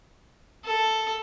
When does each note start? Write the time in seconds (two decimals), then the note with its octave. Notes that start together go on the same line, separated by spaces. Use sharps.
0.65 A4